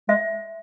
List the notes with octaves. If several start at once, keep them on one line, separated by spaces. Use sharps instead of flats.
G#3 E5